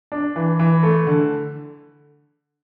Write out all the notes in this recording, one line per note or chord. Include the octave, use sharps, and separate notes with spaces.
D4
E3
E3
A3
D3